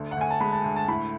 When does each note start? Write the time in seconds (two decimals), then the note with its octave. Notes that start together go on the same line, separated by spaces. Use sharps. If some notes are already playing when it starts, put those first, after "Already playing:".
Already playing: D2 D3
0.11 F#5
0.17 D2 G#5
0.31 A5
0.40 G#3 B5
0.52 A5
0.64 D2
0.76 A5
0.88 A2 B5